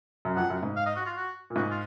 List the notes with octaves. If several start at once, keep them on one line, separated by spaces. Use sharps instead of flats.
F#2
F2 F#5
F#2
G#2
F5
D#5
F#4
F4
F#4
A#2
G#2 F#4
F4